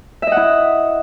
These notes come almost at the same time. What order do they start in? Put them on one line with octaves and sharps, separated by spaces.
E5 D#5 F#5 E4